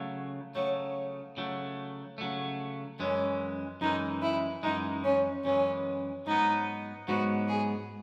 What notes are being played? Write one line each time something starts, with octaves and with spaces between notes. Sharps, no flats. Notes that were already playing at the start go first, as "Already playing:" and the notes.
Already playing: C#3 F#3 A3
C#3 F#3 A3 C#5
C#3 F#3 A3
C#3 F#3 A3
F#2 E3 G#3 C#4
F#2 E3 G#3 D#4
E4
F#2 E3 G#3 D#4
C#4
F#2 E3 G#3 C#4
G#2 F#3 B3 D#4
G#2 F#3 B3 F#4
G#4